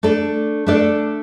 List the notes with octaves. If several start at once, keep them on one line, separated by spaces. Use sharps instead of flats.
A3 D4 A4 D5
A3 D4 A4 D5